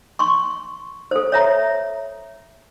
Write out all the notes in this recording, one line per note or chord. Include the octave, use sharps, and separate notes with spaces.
C6 C#6
A4 C5
C#5 E5 A#5